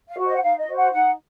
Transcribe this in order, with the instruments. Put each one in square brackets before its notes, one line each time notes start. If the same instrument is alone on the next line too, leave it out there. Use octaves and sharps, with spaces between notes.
[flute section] F5
F#4 C5
D#5
F#5
D#4 F5
D#5
F#4 C5
F#5
D#4 F#5